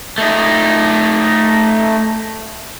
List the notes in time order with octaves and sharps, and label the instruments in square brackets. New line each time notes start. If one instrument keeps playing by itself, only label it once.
[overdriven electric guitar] A3 D#4